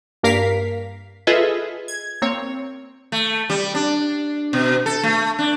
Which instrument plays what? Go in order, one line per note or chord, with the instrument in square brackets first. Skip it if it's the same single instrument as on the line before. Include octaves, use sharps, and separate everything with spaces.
[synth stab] G2 A#3 A#4 F5 B6 C7
F4 G#4 A4 B4 D#5 E5
G#6
A#3 C4 C#5
[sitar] A3
G3
D4
B2
A4
A3
D4